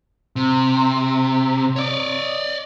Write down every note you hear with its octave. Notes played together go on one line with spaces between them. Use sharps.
C3
C#5 D5